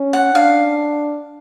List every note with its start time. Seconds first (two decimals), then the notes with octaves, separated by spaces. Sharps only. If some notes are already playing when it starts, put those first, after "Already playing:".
Already playing: C#4
0.13 F#5
0.34 D4 F5